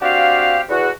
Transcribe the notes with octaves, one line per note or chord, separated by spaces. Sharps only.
C4 D4 F#4 G4 F5
E2 F#4